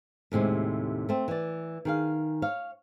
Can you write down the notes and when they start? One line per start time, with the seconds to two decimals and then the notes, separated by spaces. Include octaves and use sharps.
0.32 D#2 A2 C3 G#3
1.09 A3 C4
1.28 E3 D5
1.85 D#3 G#4 F5
2.42 C#5 F5